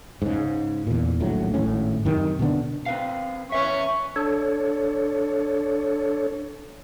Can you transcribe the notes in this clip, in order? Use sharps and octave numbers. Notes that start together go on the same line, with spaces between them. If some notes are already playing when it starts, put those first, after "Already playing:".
G#2 C#3
E2 A#2
D#1 A#1 A2 F#3
G#1 A2 C#4
F#2 C3 D#3
B2 D3 B3 D4
C4 B4 F5
E2 C#4 B4 E5 C#6
D4 A4 C#5